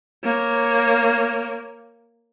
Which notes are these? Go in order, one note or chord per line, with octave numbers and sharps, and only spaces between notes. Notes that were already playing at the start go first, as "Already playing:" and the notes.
A#3 C#5